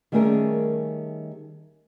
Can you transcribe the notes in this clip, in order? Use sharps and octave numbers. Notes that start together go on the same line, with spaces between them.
D#3 G3 A3 C#4 G#4 A#4